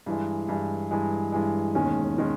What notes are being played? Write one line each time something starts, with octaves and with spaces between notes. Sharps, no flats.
G2 E3 G#3
G2 E3 G#3
G2 E3 G#3
G2 E3 G#3
E1 D#2 D#3 G#3 C#4
D#3 G#3 C#4